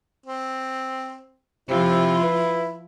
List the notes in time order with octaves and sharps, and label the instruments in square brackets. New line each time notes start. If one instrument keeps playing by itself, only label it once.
[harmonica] C4
[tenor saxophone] C3 [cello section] F3 F4 [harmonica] E4
[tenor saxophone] B4